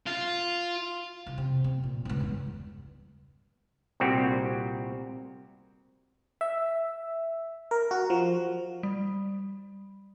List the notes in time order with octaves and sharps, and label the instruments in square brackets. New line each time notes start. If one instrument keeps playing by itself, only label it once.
[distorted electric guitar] F4
[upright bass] C2
C3
C4
A#2
G1 C#2
E2 G2
[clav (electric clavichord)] C2 A#2 C4 F#4 G4
[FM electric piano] E5
A#4
F#4
F3
[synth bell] G3